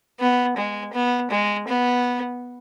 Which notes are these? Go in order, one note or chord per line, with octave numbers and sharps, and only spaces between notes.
B3
G#3
B3
G#3
B3